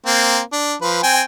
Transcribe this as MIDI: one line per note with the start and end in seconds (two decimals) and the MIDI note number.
0.06 0.40 58
0.06 0.40 60
0.53 0.74 62
0.82 1.01 53
0.82 1.01 71
1.03 1.22 60
1.03 1.22 79
1.03 1.22 80